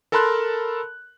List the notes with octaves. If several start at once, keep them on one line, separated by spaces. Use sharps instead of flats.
A4 A#4 A5 B5 C6 F#6